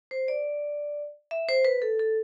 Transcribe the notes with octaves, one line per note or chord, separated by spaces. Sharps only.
C5
D5
E5
C5
B4
A4
A4